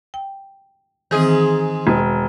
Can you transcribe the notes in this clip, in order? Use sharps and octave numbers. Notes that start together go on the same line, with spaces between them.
G5
G#2 D#3 E3 C4 G#4
E1